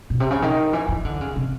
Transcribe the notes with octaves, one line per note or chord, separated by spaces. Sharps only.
B2
C3
C#3
D#3
E3
E3
D3
C#3
C3